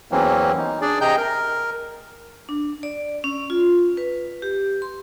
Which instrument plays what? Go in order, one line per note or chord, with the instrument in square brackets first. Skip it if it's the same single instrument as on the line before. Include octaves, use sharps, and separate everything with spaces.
[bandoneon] E2 E3 F#3 A#3 C4 C#4
D#4
D4 G#4 D5
C3 G#4 D#5 G5 A#5 G6
A#4
[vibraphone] D4
D5
C#4
F4
B4
G4
C6